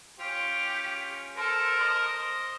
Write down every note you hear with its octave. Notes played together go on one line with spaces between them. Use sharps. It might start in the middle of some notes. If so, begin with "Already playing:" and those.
C#4 F4 G4
A4 A#4 C5
C5 D#5